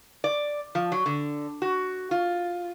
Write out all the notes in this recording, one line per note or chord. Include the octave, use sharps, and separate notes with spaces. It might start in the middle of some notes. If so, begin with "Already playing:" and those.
D5
F3
F#3
D3
F#4
F4